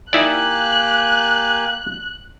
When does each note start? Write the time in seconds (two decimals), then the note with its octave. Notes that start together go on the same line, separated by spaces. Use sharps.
0.13 A#3 D#4 E4 G4 D5 G#5 F#6